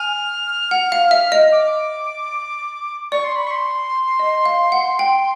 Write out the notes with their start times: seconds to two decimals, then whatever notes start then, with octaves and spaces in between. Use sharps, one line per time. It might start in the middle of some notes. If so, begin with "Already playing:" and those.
Already playing: G#5 F6
0.71 F#5
0.92 F5
1.11 E5
1.32 D#5
1.52 D6
3.12 D5 C#6
3.24 C6
3.36 B5
3.47 C#6
3.51 C6
4.19 D#5
4.46 F5
4.72 F#5
4.99 G5